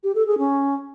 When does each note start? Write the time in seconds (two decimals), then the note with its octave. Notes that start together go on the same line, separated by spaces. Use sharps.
0.03 G4
0.15 A4
0.27 G#4
0.38 C#4